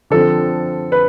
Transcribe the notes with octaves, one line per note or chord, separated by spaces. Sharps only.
D3 F3 C4 A4
B4